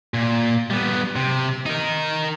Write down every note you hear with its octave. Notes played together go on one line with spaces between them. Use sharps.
A#2
G3 B3
C3
D#4 A#4